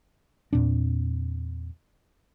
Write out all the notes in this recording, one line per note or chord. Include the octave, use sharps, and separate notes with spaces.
E2 A#2 C4 D4